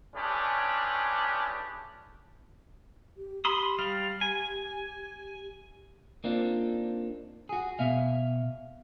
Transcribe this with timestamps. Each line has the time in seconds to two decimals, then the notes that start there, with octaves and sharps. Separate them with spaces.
0.15 B1 E3 C#4 D4 G4 G#4
3.17 G4
3.45 G4 B5 C6 D#6
3.79 G3 F5
4.21 G#5
6.24 A#3 C4 D4 D#4 F4
7.49 F#4 G#4
7.79 B2 B3 E5 F5